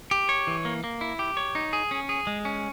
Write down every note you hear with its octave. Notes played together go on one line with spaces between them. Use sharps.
G4
C#5
E3
A#3
A#3
E4
G4
C#5
D#4
G#4
C#4
G#4
G#3
C#4